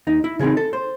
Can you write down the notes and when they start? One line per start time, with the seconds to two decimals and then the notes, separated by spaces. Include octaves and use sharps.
0.07 D#2 D#4
0.24 E4
0.39 C#3 E3 C4 D#4 G#4
0.57 A4
0.73 C5